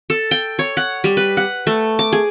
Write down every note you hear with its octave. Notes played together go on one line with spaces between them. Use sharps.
A4
G5
C#5
F#5
G3
B4
F#5
A3
D6
G#4